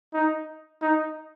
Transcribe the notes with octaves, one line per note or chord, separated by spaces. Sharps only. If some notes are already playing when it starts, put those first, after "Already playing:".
D#4
D#4